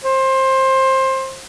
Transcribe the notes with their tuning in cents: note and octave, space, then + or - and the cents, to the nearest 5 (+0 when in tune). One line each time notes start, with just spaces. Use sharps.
C5 +20